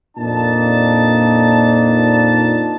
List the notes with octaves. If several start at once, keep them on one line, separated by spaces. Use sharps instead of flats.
F2 A#2 D4 D#4 A5